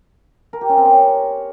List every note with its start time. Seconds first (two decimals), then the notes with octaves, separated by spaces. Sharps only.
0.53 A#4
0.61 G4
0.69 C#4
0.77 C4
0.85 C#5